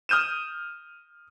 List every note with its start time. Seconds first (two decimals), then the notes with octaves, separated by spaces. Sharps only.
0.09 D#6 F6 G6 D#7 E7